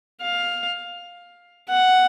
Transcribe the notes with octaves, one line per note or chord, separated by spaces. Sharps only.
F5
F#5